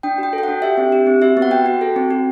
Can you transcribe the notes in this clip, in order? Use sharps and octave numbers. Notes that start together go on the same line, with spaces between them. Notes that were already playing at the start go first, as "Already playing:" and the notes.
D4 G5
F#4 G5
A4
G5
D4 F#5
G4 E5
C4
G4
C4
F#4 E5
B3
F#5
F#4 G5
F#4
A4
C4
F#4